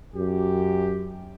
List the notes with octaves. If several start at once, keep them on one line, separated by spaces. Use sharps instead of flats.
F#2 G4